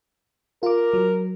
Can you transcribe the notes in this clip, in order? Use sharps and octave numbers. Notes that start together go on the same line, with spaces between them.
F4 A#4 D6
F#3